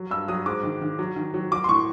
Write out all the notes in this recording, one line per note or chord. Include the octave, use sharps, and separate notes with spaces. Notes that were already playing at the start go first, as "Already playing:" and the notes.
Already playing: F#3
G2 E6
F#3 D#6
G#2 D6
D#3
D#3
F#3
D#3
F#3
F#3 D6
C6
A2 C#6